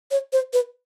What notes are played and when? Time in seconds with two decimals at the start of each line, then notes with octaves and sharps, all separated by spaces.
0.11 C#5
0.33 C5
0.53 B4